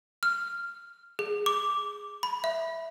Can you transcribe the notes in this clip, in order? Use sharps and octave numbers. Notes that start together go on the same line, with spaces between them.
F6
G#4
D6
B5
E5